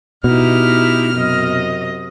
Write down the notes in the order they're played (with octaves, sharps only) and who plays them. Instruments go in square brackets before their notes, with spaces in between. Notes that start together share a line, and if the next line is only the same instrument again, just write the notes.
[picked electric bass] B2 [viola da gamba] D#4 E4 G4 [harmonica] F6
[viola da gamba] F#2 C3 D#5